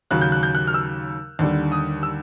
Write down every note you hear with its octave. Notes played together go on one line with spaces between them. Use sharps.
D#2 C#3 F#3 F#6
G6
F#6
G6
F#6
F6
E6
D#2 D3 G3
D#6
E6